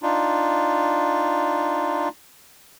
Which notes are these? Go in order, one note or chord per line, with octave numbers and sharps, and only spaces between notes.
D4 D#4 F4